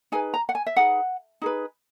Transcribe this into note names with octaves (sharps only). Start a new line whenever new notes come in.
D#4 G#4 B4 G#5
A#5
F#5
G#5
E5
D#4 G#4 B4 F#5
D#4 G#4 B4